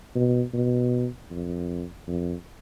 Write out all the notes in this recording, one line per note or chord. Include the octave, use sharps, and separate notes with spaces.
B2
B2
F2
F2